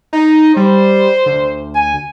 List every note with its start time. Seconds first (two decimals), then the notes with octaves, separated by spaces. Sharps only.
0.13 D#4
0.57 G3 C5
1.26 D2
1.75 G#5